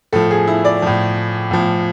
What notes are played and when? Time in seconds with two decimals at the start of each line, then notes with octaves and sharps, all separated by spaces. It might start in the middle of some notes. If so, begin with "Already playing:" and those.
0.13 A2 F3 A4
0.31 G#4
0.47 E4
0.65 D5
0.82 A2 F3
1.51 A2 F3